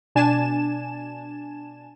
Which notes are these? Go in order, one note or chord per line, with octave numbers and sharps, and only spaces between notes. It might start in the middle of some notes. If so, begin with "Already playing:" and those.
B2 D4 G#5 A5 E7